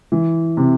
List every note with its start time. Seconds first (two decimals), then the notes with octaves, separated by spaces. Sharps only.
0.12 E3
0.57 C3